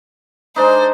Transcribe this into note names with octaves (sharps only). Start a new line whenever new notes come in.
G#3 D4 D#4 C5